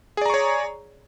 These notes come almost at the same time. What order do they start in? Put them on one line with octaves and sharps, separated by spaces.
G#4 D5 A#5 C#6 C#5